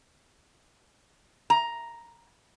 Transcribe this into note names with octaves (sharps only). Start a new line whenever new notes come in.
A#5